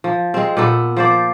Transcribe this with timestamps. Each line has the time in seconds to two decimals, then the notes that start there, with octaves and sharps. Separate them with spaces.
0.04 F3
0.34 G#3 C4
0.57 A#2 B3 A4
0.97 F3 C5 D5